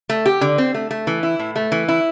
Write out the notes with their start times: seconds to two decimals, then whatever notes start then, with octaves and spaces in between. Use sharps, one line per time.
0.10 A3
0.26 G4
0.41 D3
0.58 C4
0.74 A3
0.91 A3
1.07 E3
1.23 E4
1.39 A2
1.56 A3
1.72 E3
1.88 E4